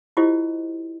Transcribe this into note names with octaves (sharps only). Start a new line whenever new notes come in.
E4 F4 G4 C5 D#5